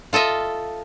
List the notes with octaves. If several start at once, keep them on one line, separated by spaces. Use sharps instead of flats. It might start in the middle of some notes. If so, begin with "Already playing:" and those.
F4 A4 D#5 E5